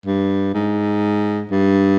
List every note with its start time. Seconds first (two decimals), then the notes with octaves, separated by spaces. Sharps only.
0.06 G2
0.54 G#2
1.51 G2